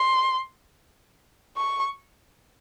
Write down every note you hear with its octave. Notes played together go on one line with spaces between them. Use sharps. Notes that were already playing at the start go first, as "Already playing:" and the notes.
Already playing: C6
C#6